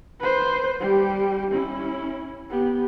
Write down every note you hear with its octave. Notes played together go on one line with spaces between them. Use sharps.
B4 C5
G3 G4
C#4 E4
B3 G4